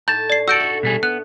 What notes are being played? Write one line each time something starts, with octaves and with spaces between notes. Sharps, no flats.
A2 D#4 G4 A5 G6
D5 C7
F#4 A4 E6 G6 D7
A3 D4 E5
B2 G3 G#4
B3 F#6